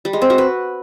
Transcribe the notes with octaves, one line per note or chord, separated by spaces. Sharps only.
G3
G#3
C4
F#4
B4